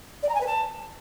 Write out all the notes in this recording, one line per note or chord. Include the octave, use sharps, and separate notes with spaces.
D5
A#5
G#5
B4
A5